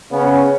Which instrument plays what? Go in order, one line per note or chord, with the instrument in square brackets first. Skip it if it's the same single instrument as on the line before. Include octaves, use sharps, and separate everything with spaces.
[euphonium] C#3 [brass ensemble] B3 C#4